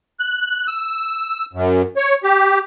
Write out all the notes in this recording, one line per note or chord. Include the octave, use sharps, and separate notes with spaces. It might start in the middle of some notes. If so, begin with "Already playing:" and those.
F#6
E6
F#2
C#5
G4